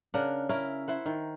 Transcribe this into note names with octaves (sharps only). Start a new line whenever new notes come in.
C#3 D4 A#4 F#5
C#4 E4 A#4
E4 C5 F#5
D#3